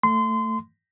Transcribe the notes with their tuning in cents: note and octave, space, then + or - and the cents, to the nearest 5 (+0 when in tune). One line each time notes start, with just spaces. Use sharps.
A3 +15 C6 -25